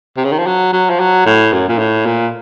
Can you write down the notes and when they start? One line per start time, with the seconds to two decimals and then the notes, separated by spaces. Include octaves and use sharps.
0.17 C3
0.24 C#3
0.32 D#3
0.39 F3
0.46 F#3
0.73 F#3
0.90 F3
1.00 F#3
1.26 A2
1.53 F#2
1.69 A#2
1.79 A2
2.06 A#2